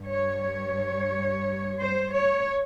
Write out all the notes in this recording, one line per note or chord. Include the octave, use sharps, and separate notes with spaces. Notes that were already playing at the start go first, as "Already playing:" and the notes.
Already playing: G2 G3
C#5
C#5
C5
C#5